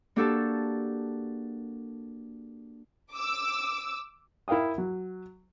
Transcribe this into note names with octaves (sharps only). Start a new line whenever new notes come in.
A#3 D4 F#4 G4 A4
D6 E6
E4 A#4 F5 G5 D#6
F#3